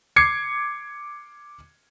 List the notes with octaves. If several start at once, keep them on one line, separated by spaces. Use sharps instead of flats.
D6 G#6 C7 C#7